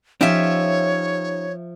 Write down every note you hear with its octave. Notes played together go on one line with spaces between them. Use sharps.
F3 C#4 D#4 G4 C#5 E5